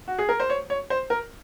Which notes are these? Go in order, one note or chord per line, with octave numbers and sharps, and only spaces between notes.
F#4
G#4
A#4
C5
C#5
C#5
C5
A#4